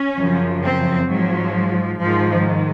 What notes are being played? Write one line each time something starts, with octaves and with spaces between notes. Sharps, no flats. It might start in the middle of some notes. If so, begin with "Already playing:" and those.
Already playing: C#4
F#2 C#3 F3
C4
G#2 F3 F#3
G#2 D#3 F3